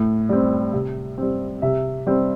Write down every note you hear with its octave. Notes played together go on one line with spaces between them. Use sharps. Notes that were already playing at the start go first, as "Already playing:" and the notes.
Already playing: A2
G3 C4
C3
G3 C4
C3 E5
G3 C4